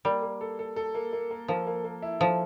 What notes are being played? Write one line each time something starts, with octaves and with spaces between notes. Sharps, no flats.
G3 A#3
A#3
A4
A4
A4
A#3
A#3
A#3
F3 A#3
A#3
A#3
E4
F3 A4